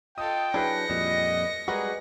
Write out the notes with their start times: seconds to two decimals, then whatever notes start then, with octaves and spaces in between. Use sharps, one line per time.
0.18 F4 A4 D#5 G5 D#6
0.54 F#3 D4 E4 G#4 B4 A#6 C#7
0.90 F2 A#2 G3 D#5
1.68 G3 G#3 F#4 G#4 A#4 B4 D#5